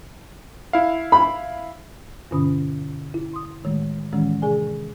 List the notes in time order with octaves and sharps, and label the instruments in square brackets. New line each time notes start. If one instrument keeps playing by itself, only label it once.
[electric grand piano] E4 F5
[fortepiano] B5
[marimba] G2 B2 D3 C#4 B5 D#6
E4
C6 D#6
A2 D#3 G#3 A3
A2 D#3 E3 G#3 C#4
C3 G#4 D5 G#5